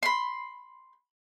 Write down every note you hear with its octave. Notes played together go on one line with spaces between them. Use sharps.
B5 C6